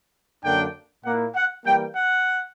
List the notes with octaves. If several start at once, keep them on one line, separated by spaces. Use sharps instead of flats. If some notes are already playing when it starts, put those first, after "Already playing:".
F#2 D3 A#3 D4 G5
A#2 A#3 E4 F#5
F#5
E3 G3 A#3 G5
F#5